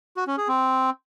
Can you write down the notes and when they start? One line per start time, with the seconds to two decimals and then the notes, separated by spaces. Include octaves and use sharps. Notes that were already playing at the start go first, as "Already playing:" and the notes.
0.17 F#4
0.27 C#4
0.38 G#4
0.48 C4